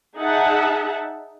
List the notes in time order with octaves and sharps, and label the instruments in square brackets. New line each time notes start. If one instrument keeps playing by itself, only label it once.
[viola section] D#4 G#4 E5 F#5 A5